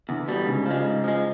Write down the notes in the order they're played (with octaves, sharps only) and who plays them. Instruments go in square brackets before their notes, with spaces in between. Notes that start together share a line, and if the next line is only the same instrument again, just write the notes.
[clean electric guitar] E2 [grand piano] D3
[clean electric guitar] B2 G3
[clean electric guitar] G#2 [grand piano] C#3
[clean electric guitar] F3 G#3
G#2
F3 G#3